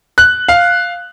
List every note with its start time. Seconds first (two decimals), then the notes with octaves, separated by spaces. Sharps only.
0.18 F#6
0.48 F5